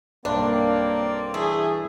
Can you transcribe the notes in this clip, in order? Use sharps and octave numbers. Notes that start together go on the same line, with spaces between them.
B1 G2 A#3 C4 D4 D5 E5
E3 A3 G#4